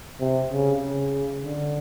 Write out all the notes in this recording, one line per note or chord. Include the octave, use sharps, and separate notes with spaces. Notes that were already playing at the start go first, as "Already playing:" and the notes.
C3
C#3
C#3
D3